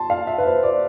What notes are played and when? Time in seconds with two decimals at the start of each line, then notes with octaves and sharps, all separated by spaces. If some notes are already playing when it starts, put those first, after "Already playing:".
Already playing: A5 C6
0.10 F5
0.27 E5
0.38 B4
0.46 C5
0.63 D5